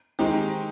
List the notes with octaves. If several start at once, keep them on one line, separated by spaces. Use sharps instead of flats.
D#3 G#3 C4 D#4 G4